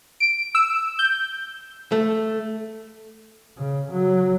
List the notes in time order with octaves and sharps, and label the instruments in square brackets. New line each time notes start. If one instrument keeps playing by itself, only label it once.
[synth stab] D7
E6
G6
[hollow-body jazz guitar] A3
[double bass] C#3
F#3